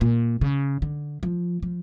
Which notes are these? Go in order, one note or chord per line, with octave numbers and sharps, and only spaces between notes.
A#2
C#3
D3
F3
F3